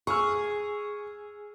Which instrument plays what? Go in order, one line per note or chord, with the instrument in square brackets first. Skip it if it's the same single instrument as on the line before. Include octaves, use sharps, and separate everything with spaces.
[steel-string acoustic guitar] G#4 [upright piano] C#6 E6 F6